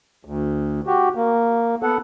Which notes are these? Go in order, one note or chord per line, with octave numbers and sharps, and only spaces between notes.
D2
F#4 G4
A#3
B3 A4 F#5